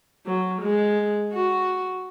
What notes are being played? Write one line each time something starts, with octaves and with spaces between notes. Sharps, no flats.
F#3
G#3
F#4